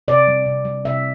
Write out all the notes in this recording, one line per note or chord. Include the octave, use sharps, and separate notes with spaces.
C3 D5
G3
C3
G3
C3 E5